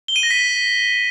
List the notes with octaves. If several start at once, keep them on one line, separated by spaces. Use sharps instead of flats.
G7
D#7
A#6
B6